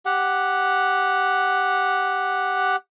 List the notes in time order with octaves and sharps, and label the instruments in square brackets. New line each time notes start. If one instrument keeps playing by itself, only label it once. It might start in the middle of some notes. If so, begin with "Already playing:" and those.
[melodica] G4 F#5